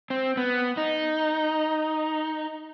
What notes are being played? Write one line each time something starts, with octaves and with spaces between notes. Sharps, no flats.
C4
B3
D#4